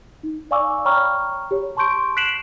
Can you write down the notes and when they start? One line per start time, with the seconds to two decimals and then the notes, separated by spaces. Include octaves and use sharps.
0.23 D#4
0.51 D5 F5 G#5 C#6 D6 E6
0.85 C#5 G5 A#5 B5 C#6 F6
1.51 G4 C#5
1.77 A5 C6 C#6 G6 D7
2.17 F#6 B6 C7 D7 E7 F#7